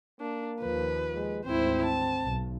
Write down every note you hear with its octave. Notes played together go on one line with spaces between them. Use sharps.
A#3 D4
D#2 F3 B4
G#3
G#1 D2 C4 E4 C5
A5
B1